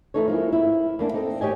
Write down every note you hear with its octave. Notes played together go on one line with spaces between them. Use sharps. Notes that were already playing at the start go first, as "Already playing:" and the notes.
E3 A3 D#4 A4 C#5
F3 G#3 A#3 E4
E4
E2 A#3 D4
C4 D#4 A4 D#5
D#2 G4 C#5 D#5 G#5